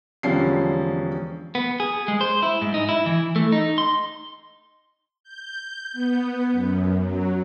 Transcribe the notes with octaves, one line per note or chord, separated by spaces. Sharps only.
E1 D3 F3 G3 C#4 C7
B3
G#4
G#3
C5
E4
G#2
D#4
E4
E3
A3
D#4
C6
G6
B3
F#2
F#3